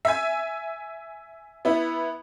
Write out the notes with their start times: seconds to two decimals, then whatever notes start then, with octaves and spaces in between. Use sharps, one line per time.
0.05 E5 G#5
1.65 B3 E4